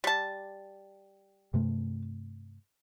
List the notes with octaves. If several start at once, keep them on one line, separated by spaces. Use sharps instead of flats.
G3 A5
G2 C3 A3